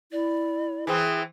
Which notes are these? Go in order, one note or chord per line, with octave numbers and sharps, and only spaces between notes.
E4 D5
E3 C4 G#4